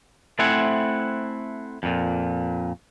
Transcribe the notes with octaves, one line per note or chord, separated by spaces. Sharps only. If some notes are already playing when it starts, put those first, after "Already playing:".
A3 C4 E4 C5 F#5 G#5
F2 A#2